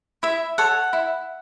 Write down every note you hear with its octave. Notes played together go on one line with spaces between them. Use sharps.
E4 E5
A4 C#5 F#5
E4